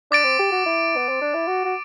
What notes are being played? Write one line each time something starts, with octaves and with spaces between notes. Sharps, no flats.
D4 D6 A6 D7
C4
G4
F#4
E4
B3
C4
D4
E4
F#4
F#4